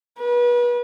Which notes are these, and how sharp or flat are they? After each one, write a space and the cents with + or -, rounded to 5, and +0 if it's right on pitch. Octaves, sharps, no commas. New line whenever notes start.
B4 -35